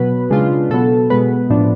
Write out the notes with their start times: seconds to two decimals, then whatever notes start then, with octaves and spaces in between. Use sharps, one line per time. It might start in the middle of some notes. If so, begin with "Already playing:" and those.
Already playing: B2 F#3 B3 B4
0.30 C#3 G#3 D4 F4
0.70 B2 F#3 B3 A4
1.10 B2 G#3 B3 B4
1.50 A2 F3 B3 D4